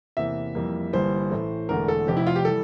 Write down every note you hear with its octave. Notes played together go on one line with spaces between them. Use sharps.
E2 C3 E3 A#3 E5
F2 E3 G3 A#3
G1 G2 E3 G3 A#3 C5
A1 A2 E3 A3
E1 E2 D3 A3 A#4
A4
F1 F2 C3 G4
E4
F4
G4
E3 G3 A4